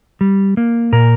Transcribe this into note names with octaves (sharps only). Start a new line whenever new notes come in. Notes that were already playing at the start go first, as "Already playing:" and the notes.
G3
A#3
A#2 A#4